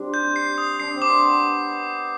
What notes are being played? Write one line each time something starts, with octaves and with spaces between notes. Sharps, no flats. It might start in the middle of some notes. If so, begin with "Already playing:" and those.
Already playing: G3 C4 D4
G6
C7
D#6
D4 C7
C4
D6
B3